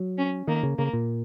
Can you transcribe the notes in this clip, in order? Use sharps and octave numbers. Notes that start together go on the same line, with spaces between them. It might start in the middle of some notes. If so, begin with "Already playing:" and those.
Already playing: F#3
C#4
D#3 A#3
C#3
C#3 A#3
A#2